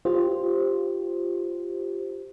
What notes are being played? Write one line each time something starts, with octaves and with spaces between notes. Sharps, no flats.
F4 G4 C5